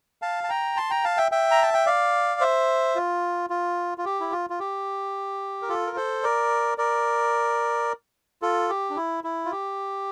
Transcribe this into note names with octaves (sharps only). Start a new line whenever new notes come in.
F5 A5
A5
G5 A#5
A5 C6
G5 A#5
F5 A5
E5 G5
E5 G5
A#5
A5
G5
D5 F5
C5 E5
F4
F4
F4
G4
E4
F4
F4
G4
A#4
F4 A4
A#4
A4 C5
A#4 D5
A#4 D5
F4 A4
G4
D4
E4
E4
F4
G4